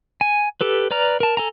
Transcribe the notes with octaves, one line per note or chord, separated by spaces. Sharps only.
G#5
G4 A4 B4
B4 D5 A#5 F6
A#4 A5
A4 G#5 A#5